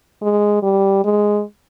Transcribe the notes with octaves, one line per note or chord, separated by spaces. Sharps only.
G#3
G3
G#3